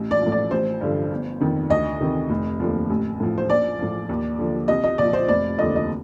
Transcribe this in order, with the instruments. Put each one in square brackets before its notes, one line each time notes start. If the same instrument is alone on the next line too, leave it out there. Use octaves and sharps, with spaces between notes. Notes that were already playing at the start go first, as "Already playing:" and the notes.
Already playing: [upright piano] A1
D5
F3
A2
D5
A1 C5
G2 D3 F3
G1
F2 D#3
D2 D#5
C3 D#3
F1
D#2 D3 F3
A1
A2 F3
C5
A#1 D5
A2 F3
D#2
D3 F3
C2 D#5
D#5
A#2 F3 D5
C5
F1 D5
D#2 D3 F3 D#5
D#5